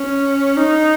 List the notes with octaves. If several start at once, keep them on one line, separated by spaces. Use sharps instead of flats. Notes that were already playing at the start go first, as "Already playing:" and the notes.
Already playing: C#4
D#4